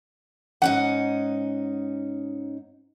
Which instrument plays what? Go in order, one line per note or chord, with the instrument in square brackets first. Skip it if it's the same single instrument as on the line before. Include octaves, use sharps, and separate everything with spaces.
[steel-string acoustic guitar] G#2 C#4 D#4 [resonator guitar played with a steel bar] F#5